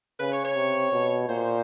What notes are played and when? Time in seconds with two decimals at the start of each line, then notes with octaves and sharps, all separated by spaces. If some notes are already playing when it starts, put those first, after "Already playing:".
0.20 C#3 B4
0.32 C#5
0.45 C#5
0.56 C3
0.92 B2
1.29 A#2 C5